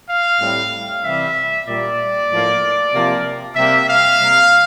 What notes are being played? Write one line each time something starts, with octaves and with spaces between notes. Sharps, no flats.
F5
A2 G3 C4
C3 E3 G3 C4 E5
A#2 G3 A#3 D5
A2 F3 A#3
C3 F3 A#3
C3 G3 A#3 E5
F5
C3 G3 A#3